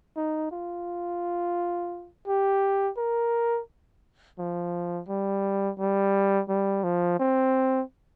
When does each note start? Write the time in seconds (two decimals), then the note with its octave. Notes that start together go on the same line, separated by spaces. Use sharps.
0.16 D#4
0.51 F4
2.27 G4
2.97 A#4
4.39 F3
5.09 G3
5.79 G3
6.49 G3
6.84 F3
7.19 C4